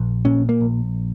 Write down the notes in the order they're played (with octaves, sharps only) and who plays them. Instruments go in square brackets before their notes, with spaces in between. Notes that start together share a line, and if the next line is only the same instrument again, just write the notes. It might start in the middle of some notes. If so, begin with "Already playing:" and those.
Already playing: [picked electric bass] A#1
A#2 C#4
A#3
A#1